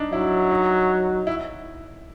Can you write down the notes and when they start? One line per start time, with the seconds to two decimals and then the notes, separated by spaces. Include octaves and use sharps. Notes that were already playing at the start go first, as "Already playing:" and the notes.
Already playing: D4 D#4
0.12 F#3 E4
0.51 D#4
1.27 E4